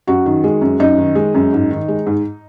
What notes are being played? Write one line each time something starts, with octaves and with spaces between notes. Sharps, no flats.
F#2 F#4
D#3
G#3
F#2
F#2 D#4
D#3
G#3
F#2
G#2
D#3
G#3
G#2